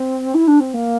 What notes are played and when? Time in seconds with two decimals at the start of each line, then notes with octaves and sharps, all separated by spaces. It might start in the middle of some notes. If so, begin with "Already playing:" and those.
Already playing: C4
0.34 E4
0.47 D4
0.60 C4
0.74 A#3